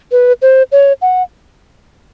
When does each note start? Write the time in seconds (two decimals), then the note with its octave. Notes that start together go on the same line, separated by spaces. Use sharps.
0.12 B4
0.42 C5
0.72 C#5
1.02 F#5